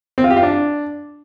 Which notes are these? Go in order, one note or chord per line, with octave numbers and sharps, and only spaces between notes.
C4
F4
G4
F4
D4